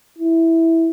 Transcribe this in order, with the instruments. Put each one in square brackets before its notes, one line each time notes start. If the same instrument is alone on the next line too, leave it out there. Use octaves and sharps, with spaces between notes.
[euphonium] E4